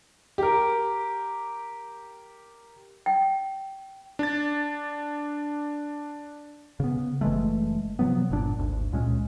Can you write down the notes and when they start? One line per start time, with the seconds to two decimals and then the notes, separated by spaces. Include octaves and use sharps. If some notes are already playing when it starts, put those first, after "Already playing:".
0.38 G4 A#4
3.06 G5
4.19 D4 A6
6.80 C#3 B3
7.21 F#1 E3 G#3 A3
7.99 C3 F3 F#3 B3
8.30 G1 A#2 D4
8.59 G#1 D2
8.92 C#2 A#2 G#3 C#4